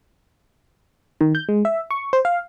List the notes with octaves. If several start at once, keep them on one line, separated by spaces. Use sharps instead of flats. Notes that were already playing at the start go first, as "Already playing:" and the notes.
D#3
G6
G#3
E5
C#6
C5
F5